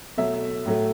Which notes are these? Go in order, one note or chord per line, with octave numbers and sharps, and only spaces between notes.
B2 F#3 A3 E5
A2 F#3 A3